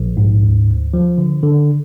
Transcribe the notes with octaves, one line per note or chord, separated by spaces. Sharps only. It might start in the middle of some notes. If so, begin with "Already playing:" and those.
Already playing: A#1
G#2
D2
D2
F3
D3
D3